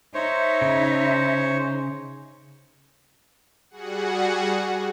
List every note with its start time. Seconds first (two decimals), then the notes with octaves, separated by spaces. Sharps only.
0.15 D#4 C5 C#5 E5
0.62 C#3
3.70 G3 F#4 G#4 F#5